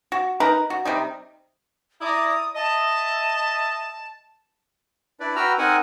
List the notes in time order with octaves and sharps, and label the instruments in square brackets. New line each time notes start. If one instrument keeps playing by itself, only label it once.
[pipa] F#4
D#4 A#4 B4 A#5
F#4
C3 G3 D#4
[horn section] E4 D5 A#5 [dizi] D#6
[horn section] D#5 E5 [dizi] A5
[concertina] D4 E4 B4 D5
F#4 B4 G5 A#5 E6 F6
C4 D#4 A#4 F#5 G#5